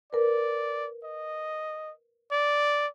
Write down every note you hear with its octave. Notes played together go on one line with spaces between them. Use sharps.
A#4 B4 D5
D#5
D5